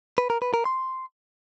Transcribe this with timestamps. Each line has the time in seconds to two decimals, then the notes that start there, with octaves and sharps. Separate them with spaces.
0.18 B4
0.30 A#4
0.42 B4
0.54 A#4
0.65 C6